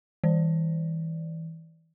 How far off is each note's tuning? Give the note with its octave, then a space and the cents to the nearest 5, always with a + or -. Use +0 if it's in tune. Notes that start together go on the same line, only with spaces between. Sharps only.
E3 -25 D5 +0